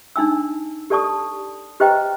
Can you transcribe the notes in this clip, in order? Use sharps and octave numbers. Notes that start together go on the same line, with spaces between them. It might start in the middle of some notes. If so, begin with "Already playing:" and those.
D4 D#4 G#5 E6
G4 A4 D5 A5 C#6 D#6
G4 B4 C5 D#5 G5 A#5